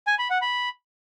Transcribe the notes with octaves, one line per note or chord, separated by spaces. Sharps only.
G#5
B5
F#5
B5